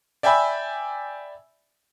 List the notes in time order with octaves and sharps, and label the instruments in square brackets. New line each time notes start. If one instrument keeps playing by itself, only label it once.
[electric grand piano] D5 E5 G5 G#5 B5 E6